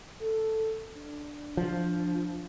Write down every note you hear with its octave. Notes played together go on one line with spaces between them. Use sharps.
A4
D4
F3